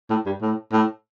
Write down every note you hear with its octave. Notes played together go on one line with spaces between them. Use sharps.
A2
G2
A2
A2